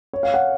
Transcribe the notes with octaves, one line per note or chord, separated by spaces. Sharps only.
C#5
F5
F#5